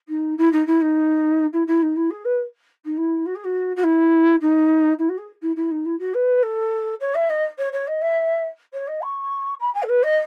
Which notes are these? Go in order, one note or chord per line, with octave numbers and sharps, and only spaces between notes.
D#4
E4
D#4
E4
D#4
E4
E4
D#4
E4
G#4
B4
D#4
E4
F#4
G#4
F#4
F#4
E4
D#4
E4
F#4
G#4
E4
E4
D#4
E4
F#4
B4
A4
C#5
E5
D#5
C#5
C#5
D#5
E5
C#5
D#5
C#6
B5
G#5
A4
B4
D#5